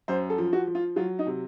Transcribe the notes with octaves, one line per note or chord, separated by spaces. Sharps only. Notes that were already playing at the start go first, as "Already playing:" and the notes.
F#2 C5
A4
F3
F#4
F3
F4
F#3 F4
D#4
C3